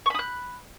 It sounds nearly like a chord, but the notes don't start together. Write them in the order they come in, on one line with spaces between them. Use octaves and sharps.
C#6 B5 D#6 F#6